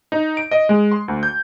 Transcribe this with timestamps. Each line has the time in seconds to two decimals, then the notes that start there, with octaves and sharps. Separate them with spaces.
0.12 D#4
0.37 D7
0.51 D#5
0.69 G#3
0.92 C6
1.08 D2
1.23 G6